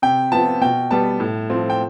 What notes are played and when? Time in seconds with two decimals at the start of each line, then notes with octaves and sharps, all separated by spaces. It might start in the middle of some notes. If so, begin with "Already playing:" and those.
0.02 C3 G5
0.32 F3 B3 A5
0.61 B2 G5
0.91 G3 B3 A5
1.20 A2
1.50 F3 C4
1.70 G5